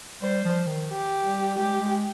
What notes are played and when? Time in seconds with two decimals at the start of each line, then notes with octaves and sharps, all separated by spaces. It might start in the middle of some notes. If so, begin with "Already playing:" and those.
0.22 G3 C5
0.45 F3
0.67 D#3
0.90 G4
1.24 G3
1.58 G#3 G4
1.81 G#3